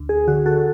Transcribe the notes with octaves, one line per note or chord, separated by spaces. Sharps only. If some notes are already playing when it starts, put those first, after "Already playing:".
Already playing: D2
G#4
D3 F#4
F#4 A4